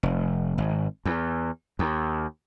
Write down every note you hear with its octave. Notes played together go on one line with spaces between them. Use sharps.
F1
G#1
E2
D#2